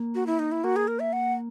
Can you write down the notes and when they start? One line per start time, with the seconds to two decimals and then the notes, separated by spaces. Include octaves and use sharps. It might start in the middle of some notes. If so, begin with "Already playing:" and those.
Already playing: A#3
0.15 F#4
0.27 E4
0.39 D#4
0.52 E4
0.64 A#3 F#4
0.76 G#4
0.88 A#4
1.00 E5
1.13 F#5